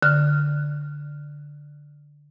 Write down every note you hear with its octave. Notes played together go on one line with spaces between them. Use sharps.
D3 F6